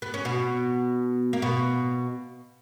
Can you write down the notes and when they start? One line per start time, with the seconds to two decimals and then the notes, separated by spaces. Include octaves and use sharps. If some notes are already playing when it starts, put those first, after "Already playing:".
0.02 B3
0.14 C#4
0.25 B2 B3
1.33 A#3
1.42 B2 B3